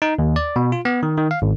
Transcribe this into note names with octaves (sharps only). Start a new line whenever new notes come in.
D#4
D#2
D5
B2
F4
B3
D#3
D#3
F5
G#1